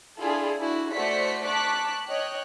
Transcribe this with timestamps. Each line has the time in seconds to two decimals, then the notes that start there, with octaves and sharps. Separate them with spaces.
0.18 D4 E4 F4 G#4 A4
0.59 D4 E4 F#4
0.92 A3 F#4 C5 D5 B6 C#7
1.45 A5 C#6 D6 F#6 B6
2.09 C#5 D#5 G5 F#6